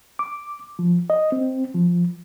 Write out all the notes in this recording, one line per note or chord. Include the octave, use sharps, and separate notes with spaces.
D6
F3
D#5
C4
F3